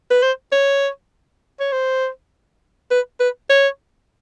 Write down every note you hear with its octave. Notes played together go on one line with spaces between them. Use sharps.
B4
C5
C#5
C#5
C5
B4
B4
C#5